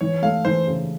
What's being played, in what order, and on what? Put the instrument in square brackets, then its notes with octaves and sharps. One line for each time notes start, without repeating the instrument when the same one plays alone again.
[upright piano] E3 [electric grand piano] C#5
[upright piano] A3 [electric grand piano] F5
[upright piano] E3 [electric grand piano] C5
[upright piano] C#3